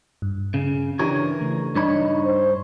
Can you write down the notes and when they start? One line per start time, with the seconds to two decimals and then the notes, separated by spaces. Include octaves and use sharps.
0.22 G2
0.54 C#3
0.99 E3 D4 E4 G4 A#4 C#5
1.41 C#3 A3
1.75 G2 D4 D#4 C#5 B5
2.24 C5